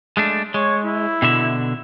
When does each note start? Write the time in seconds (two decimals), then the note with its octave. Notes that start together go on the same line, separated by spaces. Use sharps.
0.17 G#3 A3 D4
0.54 G#3 C#5
0.85 E4
1.22 B2 D3 E5